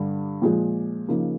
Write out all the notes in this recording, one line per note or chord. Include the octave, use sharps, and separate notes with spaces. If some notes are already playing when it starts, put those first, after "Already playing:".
Already playing: G2 D3 G3
A#2 F3 G#3
C#3 F3 A#3 D#4